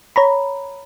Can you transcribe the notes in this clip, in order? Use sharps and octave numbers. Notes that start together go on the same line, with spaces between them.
C#5 A#5 B5